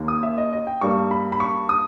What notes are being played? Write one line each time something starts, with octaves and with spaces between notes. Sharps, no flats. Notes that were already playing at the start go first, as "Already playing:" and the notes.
Already playing: D#2 D#3 A#3
D#6
E5
D#5
D#5
G5
G2 G3 A#3 C#6
B5
B5
C#6
D#6